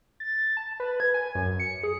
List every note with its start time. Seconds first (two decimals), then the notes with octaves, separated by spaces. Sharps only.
0.20 A6
0.57 A5
0.80 B4
1.00 G#6
1.14 G#5
1.35 F#2
1.60 C#7
1.83 G#4